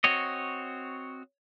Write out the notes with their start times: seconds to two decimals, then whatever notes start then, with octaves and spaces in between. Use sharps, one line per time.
0.04 C4 F#4 C#5 D#5